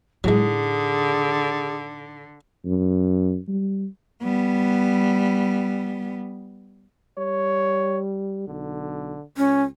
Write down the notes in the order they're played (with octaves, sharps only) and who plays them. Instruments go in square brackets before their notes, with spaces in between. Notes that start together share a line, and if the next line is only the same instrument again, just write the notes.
[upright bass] A2 D#4 [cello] D3 [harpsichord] F#3 G#3 [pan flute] G#4
[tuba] F#2
G3
[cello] G3 B3
[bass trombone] G3 [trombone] C#5
[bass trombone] B1 [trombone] D3
[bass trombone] C#2 [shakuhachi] C#4